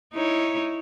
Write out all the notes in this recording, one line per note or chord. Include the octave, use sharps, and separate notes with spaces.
D#4 E4 C#5